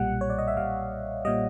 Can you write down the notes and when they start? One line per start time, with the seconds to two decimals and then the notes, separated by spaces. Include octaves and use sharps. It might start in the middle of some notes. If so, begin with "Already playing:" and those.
Already playing: B1 A#2 G3 F#5
0.21 C#5
0.30 D5
0.38 D#5
0.48 E5
0.57 B1 A#2 G3 F5
1.25 A#2 G3 D#5